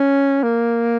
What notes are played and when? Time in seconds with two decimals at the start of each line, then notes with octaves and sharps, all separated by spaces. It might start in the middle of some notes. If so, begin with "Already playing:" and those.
Already playing: C#4
0.43 A#3